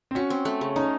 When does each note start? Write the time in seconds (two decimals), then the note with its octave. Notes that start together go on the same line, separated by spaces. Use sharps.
0.11 C4
0.15 C#4 F#4
0.30 C4
0.45 A3
0.61 C#3
0.76 C#4 D#4